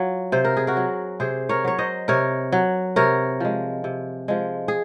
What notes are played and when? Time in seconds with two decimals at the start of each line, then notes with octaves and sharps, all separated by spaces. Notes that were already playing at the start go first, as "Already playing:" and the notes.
Already playing: F#3 F4
0.32 C3 C5
0.45 A#4
0.57 G#4
0.67 F#4 A#4
0.77 F#3
1.20 C3 G#4 C5
1.49 A#4 C#5
1.64 F#3 C#5
1.79 C5 D#5
2.08 C3 A#4 C#5
2.52 F#3
2.96 C3 A#4 C#5
3.40 F3 G#3
3.84 C3
4.28 F3 G#3
4.68 G#4